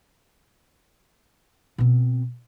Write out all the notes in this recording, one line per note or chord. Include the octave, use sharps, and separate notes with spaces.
B2 C4